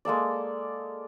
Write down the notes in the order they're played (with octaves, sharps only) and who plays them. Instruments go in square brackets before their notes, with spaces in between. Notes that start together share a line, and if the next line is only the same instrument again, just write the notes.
[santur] G#3 A#3 A4 D5